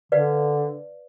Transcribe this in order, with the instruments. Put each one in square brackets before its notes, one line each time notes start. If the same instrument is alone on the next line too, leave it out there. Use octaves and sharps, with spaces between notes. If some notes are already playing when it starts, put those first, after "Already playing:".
[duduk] D3 [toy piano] B4 D5 F5